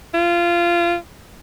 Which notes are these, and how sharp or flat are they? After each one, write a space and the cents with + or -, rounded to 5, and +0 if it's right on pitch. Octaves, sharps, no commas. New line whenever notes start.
F4 -20